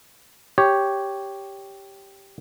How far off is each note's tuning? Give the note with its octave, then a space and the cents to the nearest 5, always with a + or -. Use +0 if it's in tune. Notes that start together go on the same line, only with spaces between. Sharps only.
G4 +0 C#5 +0